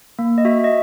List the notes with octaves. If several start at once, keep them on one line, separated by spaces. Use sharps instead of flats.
A#3
D#5
F#4 E5
D#5